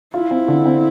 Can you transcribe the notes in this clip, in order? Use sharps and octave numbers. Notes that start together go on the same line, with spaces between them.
E4 F4
C4
D3
C4